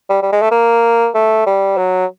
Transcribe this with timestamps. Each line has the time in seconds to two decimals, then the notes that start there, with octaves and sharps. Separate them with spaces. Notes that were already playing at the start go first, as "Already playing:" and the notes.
0.10 G3
0.23 G3
0.32 G#3
0.42 A3
0.51 A#3
1.14 A3
1.46 G3
1.77 F#3